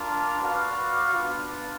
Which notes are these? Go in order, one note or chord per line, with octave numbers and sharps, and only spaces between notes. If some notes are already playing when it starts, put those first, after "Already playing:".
Already playing: D4 F4 A#4
F#4 B4 D5 F5
B3 D4 F4